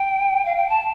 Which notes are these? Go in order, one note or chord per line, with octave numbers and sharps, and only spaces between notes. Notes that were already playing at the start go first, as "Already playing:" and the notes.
Already playing: G5
F5
G5
A5